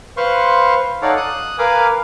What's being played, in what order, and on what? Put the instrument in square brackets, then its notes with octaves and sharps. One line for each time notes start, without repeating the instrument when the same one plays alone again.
[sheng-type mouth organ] B4 C5 F5 C6 C#6
D#4 A4 C#5 D5 F5 F#5
D#6 F#6
A#4 B4 F5 G#5 D6